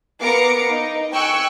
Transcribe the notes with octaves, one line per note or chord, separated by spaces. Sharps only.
B3 A#4 F5 A#5 D6 C#7
D#4
G5 G#5 C#6 E6 F#6